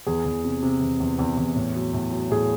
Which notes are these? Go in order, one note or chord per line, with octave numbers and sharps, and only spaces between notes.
E2 G#4
E2
C3
C3
E2
E2
E2
E2
A2
F#3
A2
F#3
A2 G#4